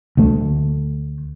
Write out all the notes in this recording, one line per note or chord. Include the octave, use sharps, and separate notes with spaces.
D2 A3